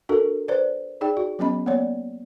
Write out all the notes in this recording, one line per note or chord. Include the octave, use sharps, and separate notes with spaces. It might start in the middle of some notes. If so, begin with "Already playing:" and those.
D4 F#4 A4 A#4
B4 C5 D5
D#4 G#4 D5 G5
F#4
F#3 B3 C#4 D#5 B5
A#3 B3 C#5 D5